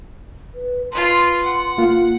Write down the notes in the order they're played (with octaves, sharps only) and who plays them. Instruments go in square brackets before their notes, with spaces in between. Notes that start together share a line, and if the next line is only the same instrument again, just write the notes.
[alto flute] B4
[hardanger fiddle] F4 B4 [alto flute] C6
[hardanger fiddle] F#5
[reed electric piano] C2 A#3 F4